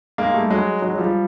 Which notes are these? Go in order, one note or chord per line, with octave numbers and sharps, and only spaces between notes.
G#3 A#3
G3 A3
F#3 G#3
F#3 G#3
F#3
F3 G3